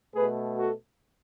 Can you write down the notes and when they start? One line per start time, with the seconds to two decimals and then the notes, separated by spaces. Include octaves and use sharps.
0.15 B2 A3 G#4 B4
0.57 F#4 A4